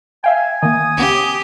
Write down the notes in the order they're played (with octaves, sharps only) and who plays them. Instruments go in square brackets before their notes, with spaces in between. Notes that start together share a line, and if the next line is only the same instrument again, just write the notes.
[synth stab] E5 F5 G5 [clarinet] G#5
[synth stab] D#3 A#3 [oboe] D#6
[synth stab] C#2 B3 C#4 [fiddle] G4